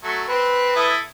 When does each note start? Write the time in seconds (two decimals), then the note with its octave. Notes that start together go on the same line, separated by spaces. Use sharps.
0.04 F#3 A3
0.28 C4 B4
0.76 E4 A4 D#6